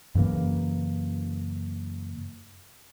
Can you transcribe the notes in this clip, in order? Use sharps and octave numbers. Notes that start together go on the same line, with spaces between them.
F#2 C#3 E3 A#3